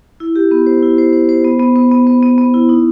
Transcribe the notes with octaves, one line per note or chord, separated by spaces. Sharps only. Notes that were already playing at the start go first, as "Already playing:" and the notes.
E4
G4
B3
C5
E4
C5
C5
C5
B3
B3
B3
B3
B3
B3
B3
E4
D#4